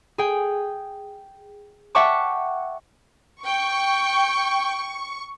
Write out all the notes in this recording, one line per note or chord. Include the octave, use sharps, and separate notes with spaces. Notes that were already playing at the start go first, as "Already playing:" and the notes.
G#4 G5
E5 F#5 G5 A5 C#6 D6
G5 C#6